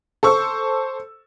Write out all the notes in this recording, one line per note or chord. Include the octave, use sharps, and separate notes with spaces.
A4 C5 C#6 E6